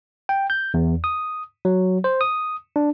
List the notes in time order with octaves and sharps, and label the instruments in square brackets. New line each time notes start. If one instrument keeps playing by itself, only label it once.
[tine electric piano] G5
G6
E2
D#6
F#3
C5
D#6
D4